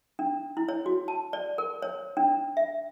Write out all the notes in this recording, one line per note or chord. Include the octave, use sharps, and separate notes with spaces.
D4
E4
C#5
F#4
A5
D5
A#4
C#5
D4
E5